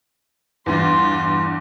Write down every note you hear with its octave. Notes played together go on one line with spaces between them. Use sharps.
E2 G2 F4 C6